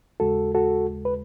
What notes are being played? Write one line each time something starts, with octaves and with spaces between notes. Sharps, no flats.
D#2 C#3 G#3 F#4 A4
F#4 A4
B4